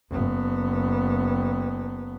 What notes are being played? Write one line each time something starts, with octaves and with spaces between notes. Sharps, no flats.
F#1 B3